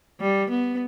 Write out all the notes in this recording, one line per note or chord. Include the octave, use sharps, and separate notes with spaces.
G3
B3